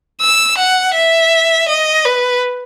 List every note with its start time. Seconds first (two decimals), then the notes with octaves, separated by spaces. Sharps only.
0.21 E6
0.58 F#5
0.95 E5
1.68 D#5
2.05 B4